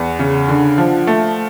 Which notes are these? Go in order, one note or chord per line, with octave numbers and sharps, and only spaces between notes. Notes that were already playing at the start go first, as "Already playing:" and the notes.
Already playing: E2 F#5
C#3
D3
F3
A3